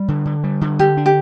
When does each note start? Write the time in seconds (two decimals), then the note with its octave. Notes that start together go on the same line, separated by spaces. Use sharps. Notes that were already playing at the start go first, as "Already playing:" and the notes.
Already playing: G3
0.08 D3
0.25 D3
0.44 G3
0.61 D3
0.79 D3 G4
0.97 D4
1.06 G4